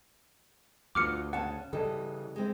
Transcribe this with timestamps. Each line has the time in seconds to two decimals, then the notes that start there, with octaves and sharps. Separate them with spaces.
0.95 D2 F4 F#4 B4 D6 F6 C#7
1.33 C#3 C#4 F#5 A5
1.73 C#3 E3 G3 A4 D#5
2.36 G#3 C4 E4